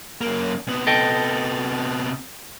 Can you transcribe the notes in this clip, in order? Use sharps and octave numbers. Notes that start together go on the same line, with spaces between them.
F#2 A#3
C3 B3
A4 D#5 G5